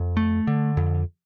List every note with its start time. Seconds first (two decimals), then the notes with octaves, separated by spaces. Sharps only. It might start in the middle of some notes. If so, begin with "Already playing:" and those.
Already playing: F2
0.17 A3
0.47 D3
0.77 F2